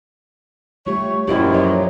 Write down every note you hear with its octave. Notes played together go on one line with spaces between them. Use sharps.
G3 A3 F4 G4 C#5
F#2 A#2 F3 E4 G4 D5 D#5
F#3 B4 C#5 D#5